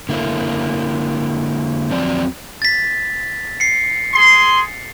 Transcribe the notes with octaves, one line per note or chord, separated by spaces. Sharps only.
D3 A#3 E4
F2 F3 F#3 C4 D5
A6 B6
C7 C#7
G#4 C6